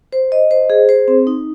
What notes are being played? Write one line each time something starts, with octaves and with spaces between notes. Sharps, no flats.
C5
D#5
C5
G#4
C5
C4
D#4